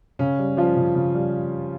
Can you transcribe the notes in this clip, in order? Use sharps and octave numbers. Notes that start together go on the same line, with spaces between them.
C#3 C#4
G3
F3 G3 F4
C#3
C#3
G3